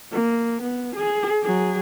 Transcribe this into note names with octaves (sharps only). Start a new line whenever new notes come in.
A#3
B3
G#4
F#3 G#4